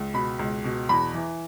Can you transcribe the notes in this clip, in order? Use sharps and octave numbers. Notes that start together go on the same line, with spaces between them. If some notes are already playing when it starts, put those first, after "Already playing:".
Already playing: C#2
B2 B5
C#2
B2
E2 B5
E3